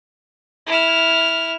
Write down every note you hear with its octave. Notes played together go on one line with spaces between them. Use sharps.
E4 F6